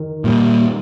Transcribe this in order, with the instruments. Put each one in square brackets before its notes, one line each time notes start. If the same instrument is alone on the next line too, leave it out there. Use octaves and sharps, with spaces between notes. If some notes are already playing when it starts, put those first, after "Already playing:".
Already playing: [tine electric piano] D#3
[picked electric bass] A#2 G3